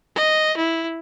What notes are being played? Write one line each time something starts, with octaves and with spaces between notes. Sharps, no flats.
D#5
E4